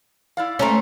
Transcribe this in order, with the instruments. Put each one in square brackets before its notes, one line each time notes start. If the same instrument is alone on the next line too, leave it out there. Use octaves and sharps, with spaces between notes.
[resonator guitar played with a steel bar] E4 D5 F5
[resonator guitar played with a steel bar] B2 A#5 [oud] A3 C4 C#4